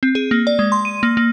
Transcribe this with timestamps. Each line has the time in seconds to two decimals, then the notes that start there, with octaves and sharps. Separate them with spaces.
0.03 C4
0.15 G#4
0.31 A#3
0.47 D5
0.59 G#3
0.72 C6
0.85 D#7
1.03 A#3
1.17 A#3